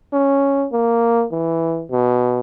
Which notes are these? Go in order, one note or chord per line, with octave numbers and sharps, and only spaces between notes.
C#4
A#3
E3
B2